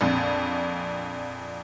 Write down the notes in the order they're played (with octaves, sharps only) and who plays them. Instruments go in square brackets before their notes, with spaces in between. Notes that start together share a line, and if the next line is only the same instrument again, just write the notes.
[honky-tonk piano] A#1 F2